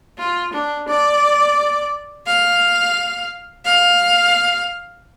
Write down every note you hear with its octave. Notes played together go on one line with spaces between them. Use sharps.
F4
D4
D5
F5
F5